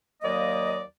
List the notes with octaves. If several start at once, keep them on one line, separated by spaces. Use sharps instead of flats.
D#2 F#3 A#3 D5 D#5